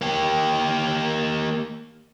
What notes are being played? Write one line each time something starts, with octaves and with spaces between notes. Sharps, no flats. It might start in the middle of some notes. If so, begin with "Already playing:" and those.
A#3 G4